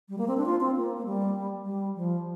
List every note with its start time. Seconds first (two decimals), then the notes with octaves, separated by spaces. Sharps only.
0.09 G3
0.18 A#3
0.28 C4
0.37 D4
0.46 F4
0.60 C4
0.76 A#3
0.97 A#3
1.05 G3
1.65 G3
1.96 F3